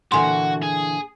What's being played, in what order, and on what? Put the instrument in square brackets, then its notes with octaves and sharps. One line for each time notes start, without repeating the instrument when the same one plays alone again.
[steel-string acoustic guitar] A#2 D3 E3 [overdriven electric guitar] F#4 [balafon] G#5 C6
[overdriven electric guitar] G#4